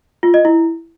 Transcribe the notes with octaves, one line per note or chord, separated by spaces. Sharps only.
F4
D#5
E4